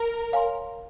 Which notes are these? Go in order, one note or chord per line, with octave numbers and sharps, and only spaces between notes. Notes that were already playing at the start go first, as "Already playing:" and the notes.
Already playing: A#4
C#5 F5 G#5 C6